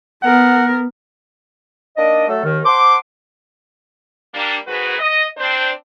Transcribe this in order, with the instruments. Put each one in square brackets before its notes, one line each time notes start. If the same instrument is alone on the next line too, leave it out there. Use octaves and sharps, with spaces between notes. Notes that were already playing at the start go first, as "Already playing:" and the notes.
[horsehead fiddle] B3 A#4 [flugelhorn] F#5
[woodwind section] A#3 D4 D#4 D5 D#5
F#3 A3 A4
D#2 D#3
C5 F#5 A5 C6 D6
[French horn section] G3 A#3 D4
G#2 D#3 F#4 G#4 B4
D#5
C4 D4 C5